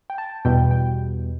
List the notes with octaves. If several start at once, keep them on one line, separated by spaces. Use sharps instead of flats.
G5
A5
E2 B2 G3 G5
G5